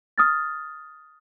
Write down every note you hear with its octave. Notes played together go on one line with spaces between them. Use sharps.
D#6 F6 A6